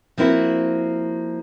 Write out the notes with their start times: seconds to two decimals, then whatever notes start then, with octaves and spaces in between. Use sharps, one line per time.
0.18 F3 A#3 C4 E4 F#4